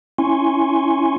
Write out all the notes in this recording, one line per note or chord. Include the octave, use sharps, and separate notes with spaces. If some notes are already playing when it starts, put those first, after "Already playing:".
C#4 E4 G#5 C6 C#6